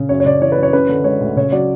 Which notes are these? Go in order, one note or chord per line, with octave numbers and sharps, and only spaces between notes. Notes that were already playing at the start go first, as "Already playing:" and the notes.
Already playing: C#3
F#2 C#5
C#5
C#3 D5
E3 C#5
B4
F#2
C#5
C#4 B4
D3
G#3 C#5
D2
C#3 C#5
F#3 D5